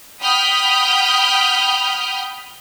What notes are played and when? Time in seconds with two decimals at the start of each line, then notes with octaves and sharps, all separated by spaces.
0.21 F#5 G5 B5 D#6 F6 G6